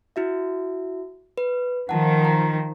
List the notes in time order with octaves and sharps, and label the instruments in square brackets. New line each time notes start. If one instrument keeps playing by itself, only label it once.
[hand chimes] E4 F#4 E5
B4
[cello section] D#3 F3 [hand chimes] F#5 A5
[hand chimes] A#5